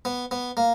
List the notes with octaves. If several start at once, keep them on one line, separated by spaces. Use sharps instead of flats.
B3
B3
A#3